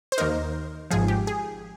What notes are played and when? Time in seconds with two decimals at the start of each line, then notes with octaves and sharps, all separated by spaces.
0.12 C5
0.18 D#2 D#3 A#3 D#4 A#4
0.91 G#1 G#2 F3 G#4
1.08 G4
1.27 G#4